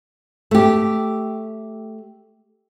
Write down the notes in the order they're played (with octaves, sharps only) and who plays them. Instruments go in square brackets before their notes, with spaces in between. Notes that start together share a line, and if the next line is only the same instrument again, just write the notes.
[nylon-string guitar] A3 G4